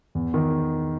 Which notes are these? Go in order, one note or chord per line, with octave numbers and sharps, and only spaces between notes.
E2
D#3